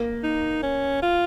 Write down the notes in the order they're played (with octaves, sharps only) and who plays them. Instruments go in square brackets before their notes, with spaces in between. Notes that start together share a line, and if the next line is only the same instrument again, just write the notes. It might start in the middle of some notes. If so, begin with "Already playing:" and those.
Already playing: [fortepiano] A#3
[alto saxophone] D#4
C#4
F4